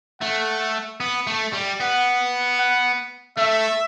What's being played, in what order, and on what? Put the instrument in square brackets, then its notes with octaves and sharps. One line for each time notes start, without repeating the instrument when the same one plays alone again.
[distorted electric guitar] A3 [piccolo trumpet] F#5
[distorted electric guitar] B3
A3
G3
[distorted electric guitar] B3 [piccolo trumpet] F#5
[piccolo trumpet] F#5
[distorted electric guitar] A3 [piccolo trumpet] E5